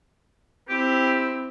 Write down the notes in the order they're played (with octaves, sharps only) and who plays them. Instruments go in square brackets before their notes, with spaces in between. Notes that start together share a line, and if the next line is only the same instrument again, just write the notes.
[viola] C4 E4 [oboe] G4